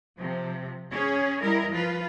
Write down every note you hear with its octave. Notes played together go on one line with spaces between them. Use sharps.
C3 F3
C#4 G#4 C#5
G3 E4 A#4 D#5
F3 F4 B4